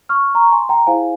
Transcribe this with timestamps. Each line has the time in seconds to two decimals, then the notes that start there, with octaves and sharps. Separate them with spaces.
0.09 C#6 F6
0.35 A#5 C#6
0.52 G#5 C6
0.69 G5 A#5
0.87 E4 G#4 C5 F5 G#5